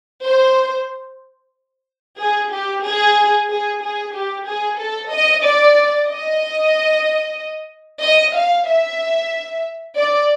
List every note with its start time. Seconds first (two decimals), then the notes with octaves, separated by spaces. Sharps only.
0.25 C5
2.20 G#4
2.52 G4
2.84 G#4
3.49 G#4
3.82 G#4
4.13 G4
4.47 G#4
4.79 A4
5.10 D#5
5.43 D5
6.08 D#5
8.03 D#5
8.35 F5
8.68 E5
9.97 D5